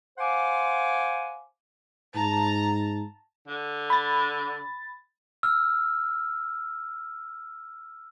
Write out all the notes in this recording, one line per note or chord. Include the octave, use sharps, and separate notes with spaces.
C5 F5 F#5 G#5 C6 D6
G#2 A5 A#5
D3
B5 A6
E6 F6